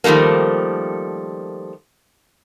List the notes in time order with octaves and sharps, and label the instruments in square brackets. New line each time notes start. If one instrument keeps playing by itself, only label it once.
[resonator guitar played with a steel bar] D#3 F3 G3 A3 A#3